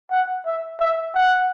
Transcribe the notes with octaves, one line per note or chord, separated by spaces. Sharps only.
F#5
E5
E5
F#5